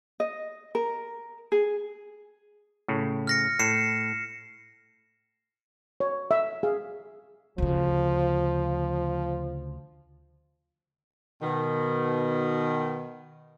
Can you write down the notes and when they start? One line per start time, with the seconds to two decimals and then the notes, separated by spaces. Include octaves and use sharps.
0.20 D#5
0.75 A#4
1.52 G#4
2.88 A2 C#3
3.27 F6 A#6 C#7
3.59 A2 C7 C#7 E7
6.00 C#5
6.31 E5
6.63 G#4 F5
7.58 D2 C#3 F3
11.42 B2 D#3